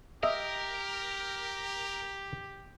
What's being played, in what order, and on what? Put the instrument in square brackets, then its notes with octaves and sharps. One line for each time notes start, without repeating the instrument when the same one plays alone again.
[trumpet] G4 [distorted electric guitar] A#4 [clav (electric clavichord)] D#5 E5